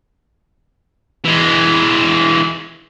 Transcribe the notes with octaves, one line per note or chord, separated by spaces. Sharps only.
E3 G#3